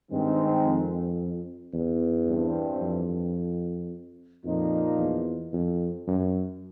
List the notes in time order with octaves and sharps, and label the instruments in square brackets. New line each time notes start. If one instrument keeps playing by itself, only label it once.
[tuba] G2 [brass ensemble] D#3 G#3 C4
[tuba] F2
E2
[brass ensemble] G2 E3 G3 C4
[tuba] F2
[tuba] F2 [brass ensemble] A#2 F3 A#3 D#4
[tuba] E2
F2
F#2